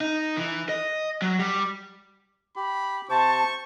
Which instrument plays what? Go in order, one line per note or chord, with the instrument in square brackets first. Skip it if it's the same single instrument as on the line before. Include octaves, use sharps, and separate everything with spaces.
[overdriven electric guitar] D#4
E3
D#5
F#3
G3
[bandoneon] G4 [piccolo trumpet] B5
[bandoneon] C3 C5 [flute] A5 [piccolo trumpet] C#6